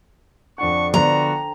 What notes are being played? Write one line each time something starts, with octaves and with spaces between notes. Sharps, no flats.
F2 D3 D4 F#5 C#6
D3 F3 B3 D4 F#4 C5 G5 A#5